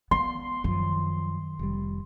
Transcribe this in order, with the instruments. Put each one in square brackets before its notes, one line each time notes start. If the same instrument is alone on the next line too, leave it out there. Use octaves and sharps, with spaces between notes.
[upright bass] B3 [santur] C6
[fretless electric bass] F#2 F3 [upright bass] D#3
[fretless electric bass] F1 G3